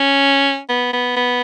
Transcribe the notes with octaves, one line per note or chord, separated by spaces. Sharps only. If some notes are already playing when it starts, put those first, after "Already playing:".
Already playing: C#4
B3
B3
B3